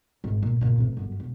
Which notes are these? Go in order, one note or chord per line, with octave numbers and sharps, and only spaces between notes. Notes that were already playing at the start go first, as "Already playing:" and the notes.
G#1
A#2
A#2 C#3
A1 C3
G1 F#2
E1